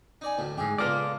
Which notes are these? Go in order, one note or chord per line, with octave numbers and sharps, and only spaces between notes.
D#4 D5 G#5
D2 A2 G3
F2 G#2 G4 G#4
C#2 B3 F4 A4 D5